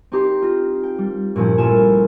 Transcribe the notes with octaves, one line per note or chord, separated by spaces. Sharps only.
C4 D#4 G4 C6
F4 A#6
G5
G3
G2 A#2 F3 C#4 E4
A#1 A3 E4 F4 G#5 E7